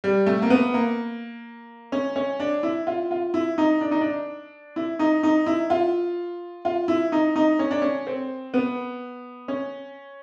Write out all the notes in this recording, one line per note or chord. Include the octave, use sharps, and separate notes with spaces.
G3
A3
A#3
B3
A#3
C#4
C#4
D4
E4
F4
F4
E4
D#4
D4
D#4
D4
E4
D#4
D#4
E4
F4
F4
E4
D#4
D#4
C#4
D4
C#4
C4
B3
C#4